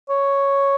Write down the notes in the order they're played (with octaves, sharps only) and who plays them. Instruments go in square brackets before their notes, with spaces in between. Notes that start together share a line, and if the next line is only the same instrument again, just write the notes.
[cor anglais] C#5